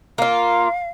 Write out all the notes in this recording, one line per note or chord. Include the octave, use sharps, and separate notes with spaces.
A#3 F4 F5